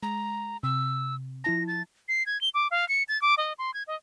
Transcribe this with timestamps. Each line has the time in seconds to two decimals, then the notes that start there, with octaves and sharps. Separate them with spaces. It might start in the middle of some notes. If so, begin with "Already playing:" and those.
0.03 G#3 A#5
0.63 C3 E6
1.44 F3 E4 A5 A#6
1.68 A6
2.08 C7
2.26 G#6
2.41 G7
2.54 D6
2.71 F5
2.89 C#7
3.08 A6
3.22 D6
3.38 D#5
3.58 C6
3.74 G#6
3.87 D#5